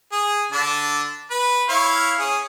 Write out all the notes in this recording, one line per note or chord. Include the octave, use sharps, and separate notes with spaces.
G#4
D3 D4 A5
B4
E4 C#5 F5
C#4 G#4